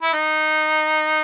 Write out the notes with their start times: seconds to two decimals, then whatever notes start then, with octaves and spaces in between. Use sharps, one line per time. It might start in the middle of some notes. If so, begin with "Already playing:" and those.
0.02 E4
0.13 D#4